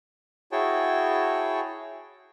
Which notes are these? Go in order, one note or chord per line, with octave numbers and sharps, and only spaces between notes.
E4 F#4 G#4 C#5 G5 A5